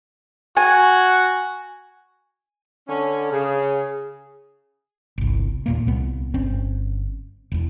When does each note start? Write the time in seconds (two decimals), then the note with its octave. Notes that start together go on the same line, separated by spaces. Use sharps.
0.57 F#4 G#5
2.89 D3 C#4
3.31 C#3 G#4
5.18 G1 C2
5.66 D#2 A#2 A#3
5.87 C2 B3
6.34 G1 C4 C#4
7.52 E1 E2